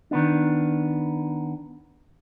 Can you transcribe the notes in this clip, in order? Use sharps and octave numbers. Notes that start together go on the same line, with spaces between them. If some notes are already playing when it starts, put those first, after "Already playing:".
D#3 B3 D4